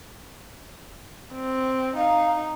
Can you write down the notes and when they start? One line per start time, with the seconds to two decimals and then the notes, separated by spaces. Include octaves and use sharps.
1.33 C4
1.97 D#4 F5